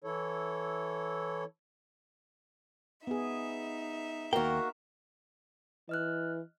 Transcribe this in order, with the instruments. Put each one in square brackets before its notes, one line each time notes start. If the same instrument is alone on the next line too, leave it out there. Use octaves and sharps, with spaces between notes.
[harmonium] E3 E4 A4 C#5
[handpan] B3 G#4 [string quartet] D#4 E5
[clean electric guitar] D#2 G5 [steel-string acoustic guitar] A#3 F#4 [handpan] A#4
[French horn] E3 [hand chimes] D#5 F6 F#6